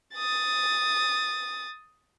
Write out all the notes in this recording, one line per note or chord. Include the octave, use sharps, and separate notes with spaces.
D#6 A6